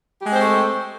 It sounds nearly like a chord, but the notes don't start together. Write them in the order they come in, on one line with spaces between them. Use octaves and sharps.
G4 G#3 C4 C5 A3